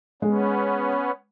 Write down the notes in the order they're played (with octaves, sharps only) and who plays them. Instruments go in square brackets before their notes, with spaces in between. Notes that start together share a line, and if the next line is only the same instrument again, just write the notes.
[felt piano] G#3 [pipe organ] B3 C#4